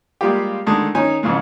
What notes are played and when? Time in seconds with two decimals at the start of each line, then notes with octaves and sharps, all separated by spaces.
0.21 G3 G#3 A#3 F4 G4
0.66 D3 D#3 G#3 A3
0.95 D#3 C#4 D#4 G#5
1.23 F2 G#2 C#3 E3 G#3